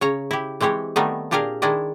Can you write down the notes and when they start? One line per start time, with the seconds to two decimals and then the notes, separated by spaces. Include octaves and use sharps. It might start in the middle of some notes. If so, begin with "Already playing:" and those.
0.01 C#3 C#5 A#5
0.31 E4 G4
0.61 E3 G#3 C4 G4 C#5
0.96 D#3 G3 A3 B3 C4 D#4
1.31 A#2 D4 G4 G#4 A#4 F5
1.62 D#3 G#3 D4 E4 D5 D#5